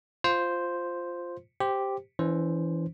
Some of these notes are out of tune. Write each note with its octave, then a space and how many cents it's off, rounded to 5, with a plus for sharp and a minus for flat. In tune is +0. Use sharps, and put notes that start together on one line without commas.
F4 +0 C5 +0
G4 +0 C5 +0
E3 +0 C#4 +45 C5 +0